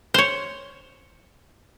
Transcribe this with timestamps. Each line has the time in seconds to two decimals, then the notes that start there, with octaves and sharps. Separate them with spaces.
0.14 C5 C#5